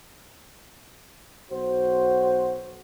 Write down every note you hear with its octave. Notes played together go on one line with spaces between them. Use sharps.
B1 F#4 C5